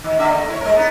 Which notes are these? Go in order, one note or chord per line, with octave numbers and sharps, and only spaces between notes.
D#3
D3 A#3 E5
A3
E4 B4 C#5
G#3 A#4
B3 D#4